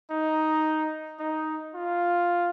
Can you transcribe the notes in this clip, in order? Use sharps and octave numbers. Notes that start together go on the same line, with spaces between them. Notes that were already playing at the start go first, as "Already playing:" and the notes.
D#4
D#4
F4